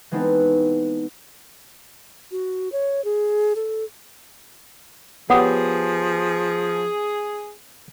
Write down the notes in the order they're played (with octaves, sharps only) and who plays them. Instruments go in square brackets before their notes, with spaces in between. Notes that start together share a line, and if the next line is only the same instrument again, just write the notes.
[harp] E3 G#3 B3 C4 D#4 A4
[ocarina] F#4
C#5
G#4
A4
[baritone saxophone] F3 [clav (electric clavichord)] B3 G4 [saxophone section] G#4 [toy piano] C#5 F#5 D#6